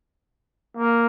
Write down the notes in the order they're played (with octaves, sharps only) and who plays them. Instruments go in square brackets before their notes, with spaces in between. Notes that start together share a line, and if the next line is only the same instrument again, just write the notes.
[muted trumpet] A#3